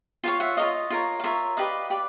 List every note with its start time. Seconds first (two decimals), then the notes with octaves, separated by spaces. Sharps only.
0.24 F4 A#4 C#5 F5 G5
0.40 E5 F#5
0.57 F4 A#4 C#5 D#5 F5
0.90 F4 A#4 C#5
1.20 F5
1.24 F4 A#4 C#5 E5
1.57 G4 B4 D5 D#5 F5
1.90 G4 B4 D5